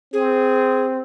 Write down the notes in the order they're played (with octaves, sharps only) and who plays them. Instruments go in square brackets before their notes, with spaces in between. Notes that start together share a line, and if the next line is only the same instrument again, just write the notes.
[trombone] C4 [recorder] G#4